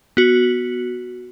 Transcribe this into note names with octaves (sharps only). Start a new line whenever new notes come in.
B3 F#4